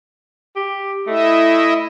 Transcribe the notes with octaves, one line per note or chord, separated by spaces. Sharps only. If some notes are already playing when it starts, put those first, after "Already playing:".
G4
A3 E4 D#5 E5